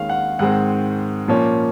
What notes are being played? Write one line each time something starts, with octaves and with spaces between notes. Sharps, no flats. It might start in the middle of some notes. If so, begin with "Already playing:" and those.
Already playing: D#2 D#3 G#3 C#4 F5
F#5
G#2 D#3 G#3 C4 F#5
A#2 F3 A#3 C#4